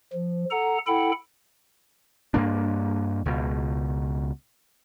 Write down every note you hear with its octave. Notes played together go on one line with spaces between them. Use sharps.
F3
A4 F#5 A#5
E4 A4 F#5 G5 B5
G2 A#3 D4
C#2 B2